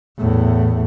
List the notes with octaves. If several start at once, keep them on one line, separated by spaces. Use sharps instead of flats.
E2 A2